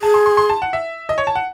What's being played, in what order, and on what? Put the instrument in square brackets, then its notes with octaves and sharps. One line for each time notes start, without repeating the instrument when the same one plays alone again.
[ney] G#4 [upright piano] A5
[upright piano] C6
C6
C6
A5
F#5
E5
D#5
C#5
A5
F#5